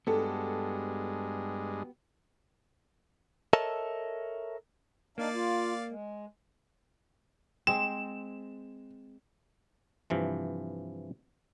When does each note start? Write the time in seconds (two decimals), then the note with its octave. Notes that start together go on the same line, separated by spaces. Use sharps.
0.07 G2 G#3 B3 F#4 G4 A4
3.53 A4 A#4 C#5 D#5 E5 A5
5.18 A#3 D4 D#4 D5 F5
5.35 F4
5.89 G#3
7.67 G#3 C4 E7
10.10 G2 C3 E3 F3